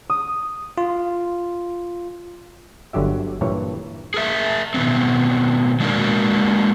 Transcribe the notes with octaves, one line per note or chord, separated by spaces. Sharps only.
D#6
F4
G1 D3 F#3 G4 E5
G2 A#2 E3 C#5
G#4 A#4 E5
B2 D#3 G3 B3 C4
G#3 A#3 D4 D#4 F#4 A#4